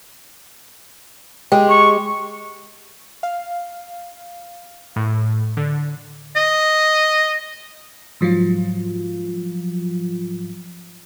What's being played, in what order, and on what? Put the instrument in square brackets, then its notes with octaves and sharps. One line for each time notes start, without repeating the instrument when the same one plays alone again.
[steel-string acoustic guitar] G#3 G4
[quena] C#6
[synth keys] F5
A2
D3
[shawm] D#5
[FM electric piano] G#2 F3 F#3 F4